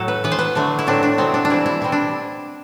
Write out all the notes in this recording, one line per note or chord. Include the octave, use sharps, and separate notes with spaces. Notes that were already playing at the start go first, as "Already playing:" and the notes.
Already playing: A2 F#3 A3 A4
B4
E3 B3 B4
C5
B4
D3 F#3 A3
E4
A2 F#3 C4 D4
D4
C3 F#3 B3 C4
D4
D4
E3 G3 C4 E4
E4
B2 G3 C4 E4
D4